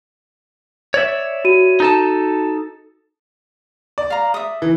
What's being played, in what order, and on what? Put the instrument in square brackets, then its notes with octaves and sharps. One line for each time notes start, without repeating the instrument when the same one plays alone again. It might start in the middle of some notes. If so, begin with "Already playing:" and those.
[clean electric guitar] C#5 D5 E5
[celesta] F#4 D#7
[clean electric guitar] D#4 A4 A5
[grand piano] D5
[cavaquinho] F5 A#5
E5 D#6
[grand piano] E3